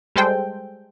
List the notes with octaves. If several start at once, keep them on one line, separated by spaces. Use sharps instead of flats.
G3 G#3 A4 C5 G5